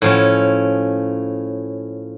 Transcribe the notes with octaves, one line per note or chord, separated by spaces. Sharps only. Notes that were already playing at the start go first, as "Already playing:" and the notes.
A2 F3 C#4